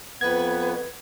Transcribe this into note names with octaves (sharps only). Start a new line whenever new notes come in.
F2 B3 B4 G#6